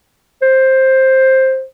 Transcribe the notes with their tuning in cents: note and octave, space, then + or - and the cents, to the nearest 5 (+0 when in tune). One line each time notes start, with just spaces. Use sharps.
C5 +10